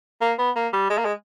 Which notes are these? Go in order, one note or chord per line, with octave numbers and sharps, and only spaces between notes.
A#3
B3
A#3
G3
G#3
A#3
G#3